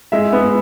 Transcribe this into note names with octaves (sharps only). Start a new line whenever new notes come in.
G#3 E5
B3